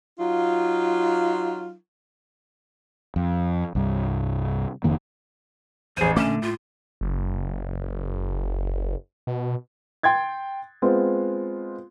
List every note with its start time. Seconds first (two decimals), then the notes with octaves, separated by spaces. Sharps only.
0.18 F#3 D#4 F4
3.16 F2
3.75 C2 G2
4.84 F1 F2 D#3 A#3
5.97 A1 E2 G#4 C5 D#7
6.16 A#2 D3 A3 C#4 D6 E7
6.42 A2 F4
7.01 F#1
9.27 B2
10.03 G5 C6 G#6 A6
10.82 G#3 B3 C4 F4